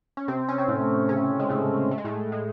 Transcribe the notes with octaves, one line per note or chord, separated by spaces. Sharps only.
C#4
C3 C4
C#4
C4
A2 A3
C#3 C#4
G#3
A2 A3
A3
G#3
A2 A3
G#3